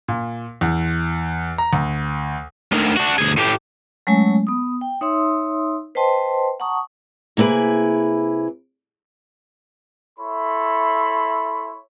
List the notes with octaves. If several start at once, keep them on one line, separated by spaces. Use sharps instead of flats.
A#2
E2
A#5
D2
D2 D#3
D4 F#4
D2 G#4
A2 G4
F#3 G#3 A3 C#4 C#5 G#5
B3 D#6
G5
D#4 C#5 E5 C6 D#6 E6
B4 C5 D#5 G5 A5 C6
F#5 A5 A#5 C#6 D#6
C3 A#3 E4 G#4 B4
E4 A4 C#5 E5 B5 C6